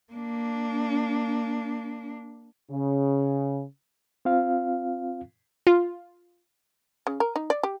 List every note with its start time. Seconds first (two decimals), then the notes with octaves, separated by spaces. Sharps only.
0.13 A#3 D4
2.70 C#3
4.25 C4 F4 F5
5.67 F4
7.07 C#3
7.20 A#4
7.36 D#4
7.50 D5
7.63 G4